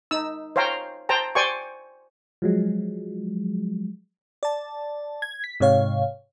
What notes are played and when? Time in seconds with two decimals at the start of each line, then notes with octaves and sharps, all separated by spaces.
0.11 D#4 E6
0.56 C5 C#5 F5 G5 A#5
1.09 C5 G5 A5 A#5
1.35 C5 D5 G5 G#5 C#6
2.42 F3 F#3 G#3
4.43 D5 A5
5.22 G#6
5.44 B6
5.60 G#2 C3 C#5 F5